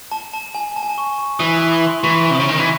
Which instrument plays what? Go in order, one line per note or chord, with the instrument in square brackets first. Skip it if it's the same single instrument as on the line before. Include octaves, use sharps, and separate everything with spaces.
[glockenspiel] A5
A5
G#5
A5
G#5
A5
C#6
C#6
[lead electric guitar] E3 [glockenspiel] D#6
[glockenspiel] D#6
D#6
C6
[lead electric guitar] E3 [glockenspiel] C#6
[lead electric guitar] C3
[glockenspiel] D#6
[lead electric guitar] C#3
D#3
E3